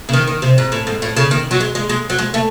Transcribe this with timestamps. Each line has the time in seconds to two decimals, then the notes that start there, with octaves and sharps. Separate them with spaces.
0.09 C#3
0.13 D#3
0.27 D#3
0.42 C3
0.58 G#2
0.72 A2
0.87 G#2
1.02 A2
1.16 C#3
1.31 D#3
1.51 F#3
1.60 G#3
1.75 G#3
1.89 G#3
2.10 F#3
2.19 G#3
2.34 A3